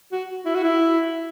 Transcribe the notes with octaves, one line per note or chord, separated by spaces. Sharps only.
F#4
E4
F#4
E4